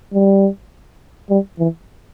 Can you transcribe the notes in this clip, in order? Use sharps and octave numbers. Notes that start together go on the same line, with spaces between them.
G3
G3
E3